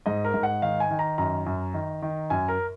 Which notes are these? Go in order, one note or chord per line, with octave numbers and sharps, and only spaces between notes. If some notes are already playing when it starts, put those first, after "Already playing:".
G#2 D#5
A#4
G#2
F#5
D#3 F5
G#5
D#3
A#5
F#2 A#5
F#2
D#3
D#3
F#2 G#5
A#4